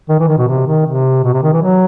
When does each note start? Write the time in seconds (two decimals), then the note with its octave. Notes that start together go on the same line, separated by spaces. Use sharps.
0.09 D#3
0.19 E3
0.28 D#3
0.38 B2
0.48 C3
0.67 D#3
0.86 C3
1.24 B2
1.34 C3
1.43 D#3
1.53 E3
1.62 F#3